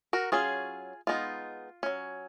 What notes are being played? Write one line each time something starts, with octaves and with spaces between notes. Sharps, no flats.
F#4 A#4
F#3 C#4 F4 G#4
G#3 B3 D#4 F4
F#3 C#4